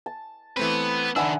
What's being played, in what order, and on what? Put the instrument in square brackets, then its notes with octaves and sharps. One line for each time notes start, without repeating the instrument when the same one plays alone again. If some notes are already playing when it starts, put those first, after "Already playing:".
[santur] A5
[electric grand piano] E3 A3 C4 [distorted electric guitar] B3 B4
[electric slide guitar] D#3 D4 [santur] E5 F#5 G#5 [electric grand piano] B5 E6